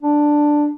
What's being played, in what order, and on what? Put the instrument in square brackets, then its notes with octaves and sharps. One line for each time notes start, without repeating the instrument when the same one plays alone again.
[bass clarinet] D4